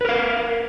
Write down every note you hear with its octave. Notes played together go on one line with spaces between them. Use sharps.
A#4 B4 F5